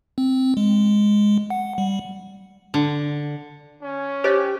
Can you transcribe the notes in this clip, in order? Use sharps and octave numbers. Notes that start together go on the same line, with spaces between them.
C4
G#3
F#5
G3
D3
C#4
G4 C5 C#5 D#5